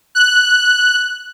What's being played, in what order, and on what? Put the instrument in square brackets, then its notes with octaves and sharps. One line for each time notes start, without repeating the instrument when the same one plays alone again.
[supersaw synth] F#6